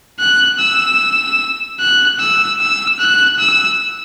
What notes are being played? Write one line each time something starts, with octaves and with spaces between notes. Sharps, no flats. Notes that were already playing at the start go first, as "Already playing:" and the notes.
F#6
E6
F#6
E6
E6
F#6
E6